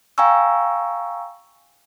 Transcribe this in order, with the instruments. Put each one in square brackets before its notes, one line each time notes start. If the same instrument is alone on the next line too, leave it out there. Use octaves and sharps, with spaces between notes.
[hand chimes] F5 G5 G#5 A#5 C#6 E6